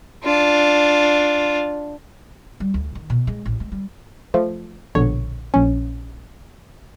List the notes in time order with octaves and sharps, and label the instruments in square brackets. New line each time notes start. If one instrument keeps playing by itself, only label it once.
[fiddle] D4 F4
[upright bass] G3
D2
D#3
B2
G#3
A1
G#3
G3
[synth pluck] F3 A3
A#1 B2 D3 C#5
A#1 C#4